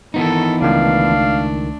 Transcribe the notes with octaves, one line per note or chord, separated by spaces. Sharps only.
D#3 E3 B3 D#4 A4
C#2 D#3 A3 D4 F5